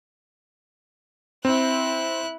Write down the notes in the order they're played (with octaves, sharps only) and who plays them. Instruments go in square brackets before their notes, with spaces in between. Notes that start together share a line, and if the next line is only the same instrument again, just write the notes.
[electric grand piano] C4 [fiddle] E4 F#6